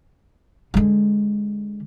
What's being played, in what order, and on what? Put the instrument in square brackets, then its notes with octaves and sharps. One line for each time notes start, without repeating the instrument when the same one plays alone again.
[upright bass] D3 G#3